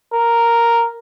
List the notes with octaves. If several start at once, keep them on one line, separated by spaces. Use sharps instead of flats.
A#4